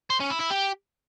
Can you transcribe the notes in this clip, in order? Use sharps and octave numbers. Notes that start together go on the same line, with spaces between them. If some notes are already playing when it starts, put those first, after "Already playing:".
C5
C#4
E4
E4
G4